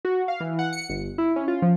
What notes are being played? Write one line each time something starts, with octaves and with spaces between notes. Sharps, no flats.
F#4
F5
E3
F#5
C#7
G1
E4
C#4
F4
F3